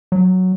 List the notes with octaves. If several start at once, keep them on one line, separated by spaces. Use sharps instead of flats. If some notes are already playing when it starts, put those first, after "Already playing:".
F#3